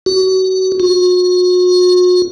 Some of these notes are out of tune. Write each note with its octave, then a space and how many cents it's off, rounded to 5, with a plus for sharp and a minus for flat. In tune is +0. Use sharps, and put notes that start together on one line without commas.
F#4 +30
F#4 -40